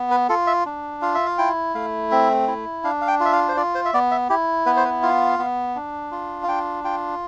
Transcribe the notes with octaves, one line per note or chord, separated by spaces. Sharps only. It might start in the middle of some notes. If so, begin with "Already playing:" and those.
Already playing: B3
B4
F4 A4
E5
D4
F4 F5
E5
F5
E4 G5
A3 F5
C4 E5
E4
D4 F5
F5
G5
F4
E5
F5
C5
F4 D5
C5
E5
B3 D5
E5
E4 G4
B3 B4
C5
B4
F4 F5
B3
D4
F4
F5
D4 G5
F4 G5